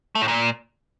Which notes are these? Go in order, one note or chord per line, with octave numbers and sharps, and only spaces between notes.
A3
A2
A#2